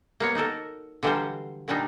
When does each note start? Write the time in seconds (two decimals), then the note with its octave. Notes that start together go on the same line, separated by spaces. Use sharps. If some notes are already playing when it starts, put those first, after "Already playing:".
0.20 A#3 B3 C#5
0.35 D#4 F#4 A4 A#4
1.03 D3 E3 F#3 G3 F4 C5
1.68 A#2 F#3 G3 D4 D#4